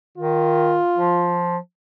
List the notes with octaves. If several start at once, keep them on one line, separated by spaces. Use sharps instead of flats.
D#3 F4
F3